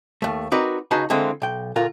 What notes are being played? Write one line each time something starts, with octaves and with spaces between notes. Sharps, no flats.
D#2 A3
C4 D#4 F#4 A#4 B4 D5
C#2 D#4 F#4 G#4 B4 A5
D3 E3 G#3 A#3 C4
B1 G5
D2 A#2 F4 A#4 F#5